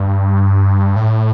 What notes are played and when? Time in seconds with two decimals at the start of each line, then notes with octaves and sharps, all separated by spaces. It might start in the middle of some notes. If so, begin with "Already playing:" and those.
Already playing: G2
0.96 A2